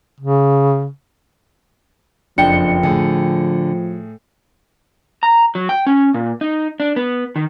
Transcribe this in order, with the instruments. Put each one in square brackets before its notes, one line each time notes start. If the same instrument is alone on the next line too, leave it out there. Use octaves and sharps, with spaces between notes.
[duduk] C#3
[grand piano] F#1 F2 [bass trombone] F3 [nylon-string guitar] D4 [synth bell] G5 C#7
[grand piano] A2 G#4 [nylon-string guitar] D3
[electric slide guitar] A#5
F#3
G5
C#4
A#2
D#4
D4
B3
D#3